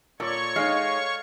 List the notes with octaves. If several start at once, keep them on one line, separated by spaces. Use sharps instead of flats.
A#2 A4 C#5 D5 C#6
G#3 D#4 F5